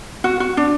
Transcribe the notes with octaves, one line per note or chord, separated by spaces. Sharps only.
F#4
F#4
D4